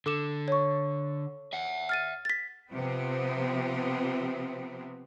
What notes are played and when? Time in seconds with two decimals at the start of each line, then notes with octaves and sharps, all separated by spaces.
0.06 D3 A4 D6 E7
0.48 C#5 C#6
1.53 E5 F#5
1.89 F6 A6 D#7
2.25 A6 B6
2.69 C3 F3 B3 C4